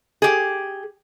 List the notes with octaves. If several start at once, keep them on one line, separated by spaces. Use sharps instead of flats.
G4 G#4